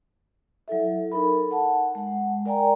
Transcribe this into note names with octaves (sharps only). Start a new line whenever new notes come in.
F#3 E4 A4 E5
D#4 A4 A#4 B5
F#5 A5
G#3 F#5
A#4 D5 G5 G#5 A#5